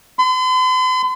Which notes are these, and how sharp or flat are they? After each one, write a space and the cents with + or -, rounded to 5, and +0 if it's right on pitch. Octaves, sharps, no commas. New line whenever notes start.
C6 -45